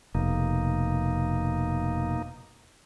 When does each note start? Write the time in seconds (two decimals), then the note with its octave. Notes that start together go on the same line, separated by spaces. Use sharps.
0.15 F1 B2 A#3 D#4